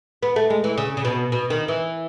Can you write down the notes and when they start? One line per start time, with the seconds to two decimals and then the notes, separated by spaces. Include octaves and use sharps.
0.23 B3
0.36 A3
0.50 G#3
0.64 E3
0.78 C#3
0.97 C#3
1.05 B2
1.32 B2
1.50 D#3
1.68 E3